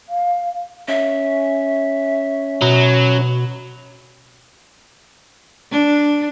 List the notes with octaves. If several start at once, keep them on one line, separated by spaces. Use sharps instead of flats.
F5
C#4 E5
B2 F#3
D4